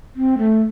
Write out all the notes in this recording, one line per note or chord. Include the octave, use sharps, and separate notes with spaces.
C4
A3